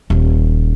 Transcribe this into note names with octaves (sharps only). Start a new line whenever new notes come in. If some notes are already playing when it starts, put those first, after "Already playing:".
D#1